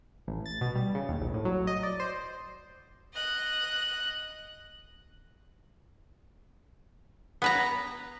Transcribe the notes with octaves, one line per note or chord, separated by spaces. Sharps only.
A1
A6
B2
G3
C#3
D#2
A#1
A2
F#3
D#5
D5
C5
D#5 F#6
B3 B4 A#5